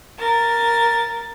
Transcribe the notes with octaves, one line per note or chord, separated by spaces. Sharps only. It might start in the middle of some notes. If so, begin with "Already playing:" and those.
A#4 A6